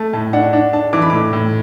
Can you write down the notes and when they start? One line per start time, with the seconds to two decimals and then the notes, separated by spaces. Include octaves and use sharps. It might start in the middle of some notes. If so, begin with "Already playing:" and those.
Already playing: A3 A5
0.13 A2 A5
0.33 D4 F#5
0.53 D4
0.73 D4 A5
0.93 E3 D6
1.02 B5
1.10 A2 D6
1.33 A2